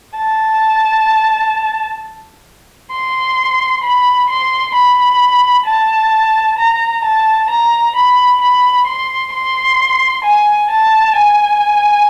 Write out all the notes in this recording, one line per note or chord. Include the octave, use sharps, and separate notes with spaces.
A5
C6
B5
C6
B5
A5
A#5
A5
A#5
B5
B5
C6
C6
G#5
A5
G#5